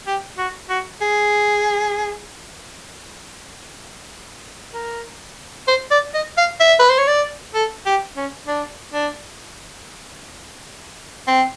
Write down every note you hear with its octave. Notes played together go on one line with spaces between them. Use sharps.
G4
F#4
F#4
G#4
A#4
C5
D5
D#5
F5
E5
B4
C5
C#5
D5
A4
G4
C#4
D4
D4
C4